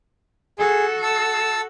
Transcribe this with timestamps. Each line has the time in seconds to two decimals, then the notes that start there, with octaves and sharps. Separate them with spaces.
0.59 F#4 G#4 A4
1.03 A5 E6